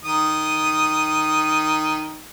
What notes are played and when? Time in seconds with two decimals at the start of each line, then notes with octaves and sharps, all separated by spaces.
0.05 D#3 D#6